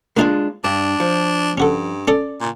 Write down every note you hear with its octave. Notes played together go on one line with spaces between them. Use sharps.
G#3 A#3 D4 D#4 F4 G#4
G2 D4
F3
G2 C#4 F#4 A4
C#4 A4 D5 D#6
A#2